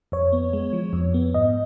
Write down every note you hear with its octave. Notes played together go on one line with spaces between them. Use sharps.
F2 C#5
B3
G#3
F3
F2
B3
G#2 D#5